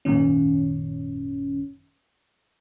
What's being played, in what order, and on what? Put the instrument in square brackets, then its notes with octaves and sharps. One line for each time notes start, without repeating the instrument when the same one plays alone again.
[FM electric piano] G#1 F#2 A#2 D#3 C#4